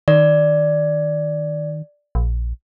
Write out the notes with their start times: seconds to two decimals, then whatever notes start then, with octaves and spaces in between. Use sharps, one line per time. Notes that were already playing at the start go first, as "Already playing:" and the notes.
0.08 D#3 D5
2.15 A#1